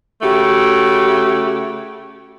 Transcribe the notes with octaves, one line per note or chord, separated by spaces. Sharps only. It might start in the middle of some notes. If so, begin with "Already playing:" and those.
C#3 A3 F#4 G4